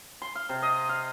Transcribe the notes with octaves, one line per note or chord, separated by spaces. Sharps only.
C6
F5
C3
D#5
F5